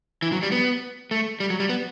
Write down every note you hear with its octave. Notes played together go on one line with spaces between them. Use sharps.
E3
F#3
G3
B3
A3
G3
F#3
G3
B3